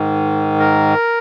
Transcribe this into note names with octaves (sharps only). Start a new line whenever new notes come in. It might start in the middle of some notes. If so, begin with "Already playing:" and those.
Already playing: G#2 D#3
A#4